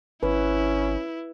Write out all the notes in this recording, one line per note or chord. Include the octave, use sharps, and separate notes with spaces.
G#1 C#4 E4 B4